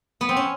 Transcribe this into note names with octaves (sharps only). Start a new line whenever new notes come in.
B3
C4
C#4